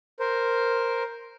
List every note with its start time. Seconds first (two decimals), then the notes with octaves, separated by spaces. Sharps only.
0.20 A#4 C5